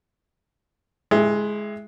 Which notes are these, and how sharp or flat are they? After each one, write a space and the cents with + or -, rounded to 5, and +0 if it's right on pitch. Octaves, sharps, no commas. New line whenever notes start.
G#3 +15 E4 +0 G4 +45